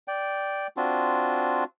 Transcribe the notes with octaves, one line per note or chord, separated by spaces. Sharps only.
D5 G5
C4 D4 F4 F#4